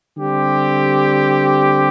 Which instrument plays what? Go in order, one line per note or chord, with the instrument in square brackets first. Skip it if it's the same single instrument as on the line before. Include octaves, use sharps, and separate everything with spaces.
[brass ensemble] D3 G3 C4 G4